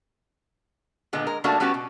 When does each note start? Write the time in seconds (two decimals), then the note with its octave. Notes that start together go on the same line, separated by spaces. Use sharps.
1.13 A#2 D3 G#3 B3
1.27 G#3 A#4
1.44 G3 A3 A#3 D4 F#4
1.60 G3 B3 C#4 F#4 G4 B4
1.74 B2